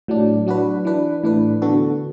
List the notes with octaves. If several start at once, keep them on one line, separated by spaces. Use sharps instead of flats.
A2 F#3 D4
F#3 D4 F#4 B4
E3 D4 B4
A2 E3 D4 B4
D3 B3 F#4 A4